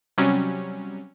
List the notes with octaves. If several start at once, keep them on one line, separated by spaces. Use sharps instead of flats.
C3 F#3 G3 C#4